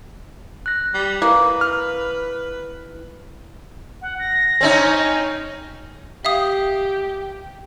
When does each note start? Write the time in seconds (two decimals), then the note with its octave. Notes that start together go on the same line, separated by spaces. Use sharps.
0.66 F#6 A#6
0.94 G3
1.22 A#3 E4 B4
1.61 F6
4.02 F#5
4.19 A#6
4.61 C4 C#4 D#4
6.25 G4 E5 F5 D#6